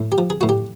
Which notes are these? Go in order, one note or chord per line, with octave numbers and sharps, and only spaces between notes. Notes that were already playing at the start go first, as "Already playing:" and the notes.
Already playing: A2
G4
F3
G#4
A2 F#4
G4